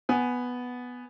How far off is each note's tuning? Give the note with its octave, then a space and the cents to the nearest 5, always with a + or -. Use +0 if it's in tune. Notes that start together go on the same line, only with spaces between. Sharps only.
B3 +0 G#5 +0